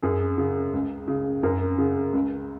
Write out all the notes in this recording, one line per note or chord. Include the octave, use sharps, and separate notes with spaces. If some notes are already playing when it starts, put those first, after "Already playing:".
F#2 G#4
C#3
C#2
C#3
F#2 A#4
C#3
C#2